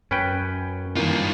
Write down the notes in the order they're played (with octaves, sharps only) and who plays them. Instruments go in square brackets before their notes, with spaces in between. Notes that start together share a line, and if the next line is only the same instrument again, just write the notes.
[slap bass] F#2 [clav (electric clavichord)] C#4 B4 G5
[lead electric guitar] G2 F4 [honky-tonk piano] D#3 E3 A#3